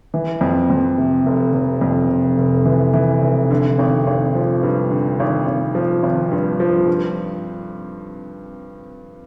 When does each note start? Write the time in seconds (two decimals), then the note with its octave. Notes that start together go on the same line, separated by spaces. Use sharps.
0.14 E3
0.41 F2
0.70 F2
0.98 C3
1.26 F1
1.54 F1
1.81 F2
2.10 F1
2.38 F1
2.66 E3
2.94 E3
3.22 F1
3.51 D3
3.79 G#1
4.07 G#1
4.35 F3
4.63 G2
4.91 D3
5.20 G#1
5.47 G#1
5.75 F3
6.03 G#1
6.32 G2
6.60 F3
6.87 G2